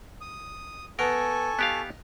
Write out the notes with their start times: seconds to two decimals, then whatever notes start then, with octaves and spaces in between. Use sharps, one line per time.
0.21 D#6
0.99 B3 A4 A#4 D#5 G#5 C#6
1.59 B3 D#4 G4 F5